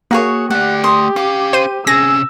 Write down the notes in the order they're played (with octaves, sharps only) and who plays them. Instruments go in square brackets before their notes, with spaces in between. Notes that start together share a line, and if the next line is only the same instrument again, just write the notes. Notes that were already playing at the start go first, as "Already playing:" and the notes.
[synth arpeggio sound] A#3 [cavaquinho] F#4 G#4 C#5
[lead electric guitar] A3 D5 [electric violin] G4 [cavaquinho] F#5
[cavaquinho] C6 D#6
[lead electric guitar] C#4 F5 [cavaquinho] D6
[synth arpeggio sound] C5 D#7
[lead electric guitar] C3 C#4 [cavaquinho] G#4 [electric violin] E6 [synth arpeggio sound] A#6